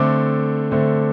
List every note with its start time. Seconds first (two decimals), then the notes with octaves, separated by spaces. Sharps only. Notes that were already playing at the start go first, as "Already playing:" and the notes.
Already playing: D3 A3 C4 D6
0.71 D3 A3 C4